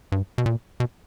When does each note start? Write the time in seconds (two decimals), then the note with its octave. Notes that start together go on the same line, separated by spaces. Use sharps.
0.12 G2
0.38 B2
0.46 A#2
0.80 B2